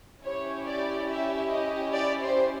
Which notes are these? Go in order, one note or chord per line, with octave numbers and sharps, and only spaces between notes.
C#4 E4 G4 C#5
D5
E5
D#5
D5
C5